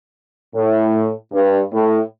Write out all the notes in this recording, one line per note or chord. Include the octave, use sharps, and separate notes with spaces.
A2
G2
A2